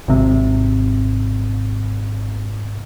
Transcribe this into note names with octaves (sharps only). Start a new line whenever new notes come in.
G#1 C3